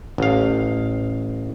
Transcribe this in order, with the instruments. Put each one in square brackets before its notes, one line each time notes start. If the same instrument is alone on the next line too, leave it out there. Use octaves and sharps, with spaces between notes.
[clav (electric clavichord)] A1 F5